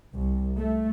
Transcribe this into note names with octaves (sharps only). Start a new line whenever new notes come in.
C2
A3